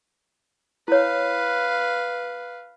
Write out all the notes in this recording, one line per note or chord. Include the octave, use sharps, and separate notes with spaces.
E4 B4 C#5 F5